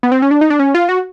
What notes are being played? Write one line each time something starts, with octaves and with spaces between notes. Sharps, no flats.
B3
C4
C#4
D4
D#4
D4
C#4
F4
F#4